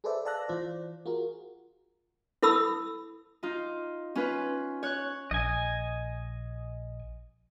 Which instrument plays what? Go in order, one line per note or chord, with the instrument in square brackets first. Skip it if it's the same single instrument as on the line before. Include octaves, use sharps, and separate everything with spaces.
[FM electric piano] G#4 A4 B4 C5 D5 E5
D5 F5 A5 E6 F#6 A#6
E3 F4 C5 D5
F4 F#4 G#4 A#4
[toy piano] E4 A4 B5 D#6 E6
[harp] D#4 F4
C#4 F4 B4
C#5 F#6
[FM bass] A#1 [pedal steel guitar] D#5 G#5